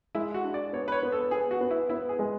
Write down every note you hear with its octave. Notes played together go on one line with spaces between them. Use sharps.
G#3 E4
F#4
D4
D5
B3 C#5
B4
C#5
B3
A4
B3 G#4
F#4
B3
E4
B3 E4
G#4
G#3